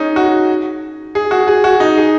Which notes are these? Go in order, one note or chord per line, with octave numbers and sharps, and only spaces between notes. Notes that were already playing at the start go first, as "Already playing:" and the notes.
Already playing: C#4 D#4 G#4
F#4
G#4
F#4
G#4
F#4
D#4
G#4